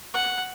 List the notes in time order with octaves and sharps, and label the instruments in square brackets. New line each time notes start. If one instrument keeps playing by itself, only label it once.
[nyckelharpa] F#5